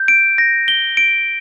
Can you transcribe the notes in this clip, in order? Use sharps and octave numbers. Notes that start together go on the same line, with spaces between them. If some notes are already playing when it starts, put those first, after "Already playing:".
Already playing: G6
D7
A#6
G7
D7